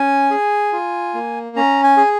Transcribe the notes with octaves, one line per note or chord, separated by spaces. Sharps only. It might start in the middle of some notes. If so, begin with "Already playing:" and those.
Already playing: C#4 G#5
G#4
F4
A#3
C#4 A#5
G#5
G#4